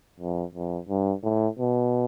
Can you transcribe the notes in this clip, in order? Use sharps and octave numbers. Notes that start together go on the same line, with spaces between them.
F2
F2
G2
A2
B2